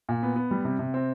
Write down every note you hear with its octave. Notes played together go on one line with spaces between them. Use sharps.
A#2
B3
B3
G3
C3
C3
C4